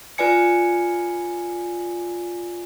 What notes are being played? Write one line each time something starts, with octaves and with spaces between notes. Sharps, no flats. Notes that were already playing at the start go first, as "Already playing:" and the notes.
F4 B4 D5 G#5 C#7